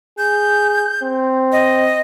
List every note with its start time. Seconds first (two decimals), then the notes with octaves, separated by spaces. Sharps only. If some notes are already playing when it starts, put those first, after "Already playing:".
0.18 G#4 G6
1.02 C4
1.52 D#5